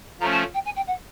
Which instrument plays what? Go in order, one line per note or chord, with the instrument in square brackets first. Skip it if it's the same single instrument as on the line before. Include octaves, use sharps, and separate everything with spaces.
[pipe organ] F3 A3 C#4 [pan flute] A#5
[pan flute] A5
G5
G#5
G5
F#5